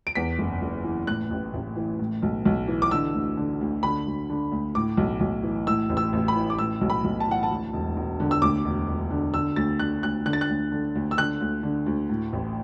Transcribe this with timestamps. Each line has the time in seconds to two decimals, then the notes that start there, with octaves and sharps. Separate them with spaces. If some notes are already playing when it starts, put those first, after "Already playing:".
0.07 D7
0.15 E2 B6
0.39 F#1
0.62 F#1
0.84 E3
1.07 A2 F#6
1.31 A1
1.54 A1
1.76 E3
1.99 A2
2.22 B1
2.45 B1
2.68 E3
2.82 D6
2.91 D3 E6
3.14 D2
3.37 D3
3.61 D2
3.83 D3 B5
4.06 D2
4.29 D3
4.51 D2
4.75 A2 D6
4.97 B1
5.20 B1
5.43 E3
5.67 A2 E6
5.89 A1
5.97 E6
6.13 A1
6.28 B5
6.36 E3
6.50 D6
6.59 A2 E6
6.81 B1
6.90 B5
7.04 B1
7.20 A5
7.27 E3 F#5
7.43 A5
7.50 D2
7.73 E1
7.97 E1
8.20 D3
8.31 E6
8.42 D2 D6
8.65 E1
8.88 E1
9.11 D3
9.34 D3 E6
9.56 D2 A6
9.80 D3 F#6
10.03 D2 F#6
10.25 D3 F#6
10.33 A6
10.41 F#6
10.49 D2
10.72 D3
10.95 D2
11.11 E6
11.18 D3 F#6
11.41 D2
11.63 D3
11.86 D2
12.10 A2
12.33 A1